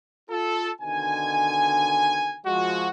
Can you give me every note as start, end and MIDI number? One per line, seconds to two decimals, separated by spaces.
0.30 0.71 65
0.30 0.71 69
0.81 2.38 47
0.81 2.38 50
0.81 2.38 51
0.81 2.38 80
2.46 2.90 53
2.46 2.90 56
2.46 2.90 66